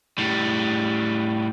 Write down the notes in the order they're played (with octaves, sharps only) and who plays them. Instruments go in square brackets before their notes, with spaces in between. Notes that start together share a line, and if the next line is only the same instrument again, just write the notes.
[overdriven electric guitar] A2 G3